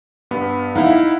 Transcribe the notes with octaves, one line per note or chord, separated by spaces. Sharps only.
G2 B3 B5
D#4 E4 F5 F#5